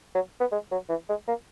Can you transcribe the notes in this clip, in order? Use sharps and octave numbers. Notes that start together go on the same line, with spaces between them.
F#3
B3
G#3
F#3
E3
G#3
A#3